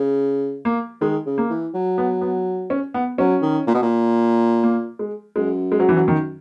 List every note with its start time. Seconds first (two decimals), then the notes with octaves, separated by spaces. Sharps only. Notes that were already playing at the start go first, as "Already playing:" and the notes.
Already playing: C#3
0.65 A#3
1.01 D#3 G#3
1.26 C#3
1.38 A#3
1.50 E3
1.74 F#3
1.98 B3
2.21 B3
2.70 C#4
2.94 B3
3.18 F#3 C#4
3.42 D#3
3.67 A#2
3.74 B2
3.82 A#2
4.63 A#3
4.99 G#3
5.36 F#2 G#3
5.72 G#3
5.80 F#3
5.89 E3
5.97 F#3
6.08 D#3